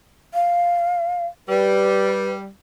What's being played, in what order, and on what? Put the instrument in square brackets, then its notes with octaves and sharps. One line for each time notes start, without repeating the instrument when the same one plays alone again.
[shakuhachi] F5
[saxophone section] G3 [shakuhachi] B4